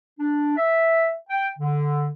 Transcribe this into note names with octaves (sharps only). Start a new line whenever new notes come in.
D4
E5
G5
D3